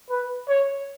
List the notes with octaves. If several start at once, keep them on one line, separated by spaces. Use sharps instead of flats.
B4
C#5